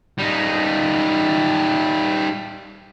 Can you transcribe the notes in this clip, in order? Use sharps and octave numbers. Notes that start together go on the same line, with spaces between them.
G3 D#4